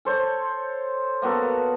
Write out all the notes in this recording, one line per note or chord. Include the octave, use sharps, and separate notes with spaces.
A4 C5 C#5
A#3 B3 F#4 A4